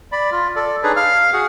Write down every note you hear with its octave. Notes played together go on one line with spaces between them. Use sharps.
D5 B5
F4
A4 D5
D4 D#4 G#4 B4 C#5
F5 F6
F#4 G#4 F#5